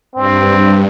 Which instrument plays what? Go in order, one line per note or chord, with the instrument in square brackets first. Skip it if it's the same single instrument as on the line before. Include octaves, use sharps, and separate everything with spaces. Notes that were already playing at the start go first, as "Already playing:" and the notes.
[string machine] G2 [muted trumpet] C4